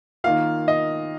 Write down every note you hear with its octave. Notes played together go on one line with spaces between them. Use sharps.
D#3 A#3 F4 F5
D#5